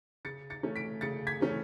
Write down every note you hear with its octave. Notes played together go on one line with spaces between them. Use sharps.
C#3 A6 C#7
A6 C#7
E3 A3 C#4
B6 D7
C#3 A6 C#7
G#6 B6
E3 A3 C#4